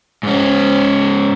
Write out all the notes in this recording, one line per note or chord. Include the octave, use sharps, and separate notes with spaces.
G#2 C#4